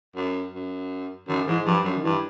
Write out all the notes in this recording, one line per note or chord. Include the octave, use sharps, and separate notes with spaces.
F#2
F#2
F#2 D#3
G#2 E3
G2 F3
F#2 F#3
D#3
G2 E3